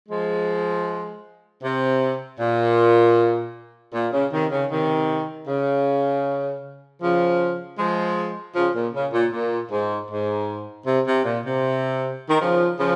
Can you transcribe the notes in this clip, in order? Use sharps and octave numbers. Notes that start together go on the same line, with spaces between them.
F3 G#3
C3
A#2
A#2
C#3
C3 D#3
C#3
C3 D#3
C#3
C#3 F3
F3 G#3
C#3 F3
A#2
C#3
A#2
A#2
G#2
G#2
C3
C3
A#2
C3
D#3
C#3 F3
C#3 F3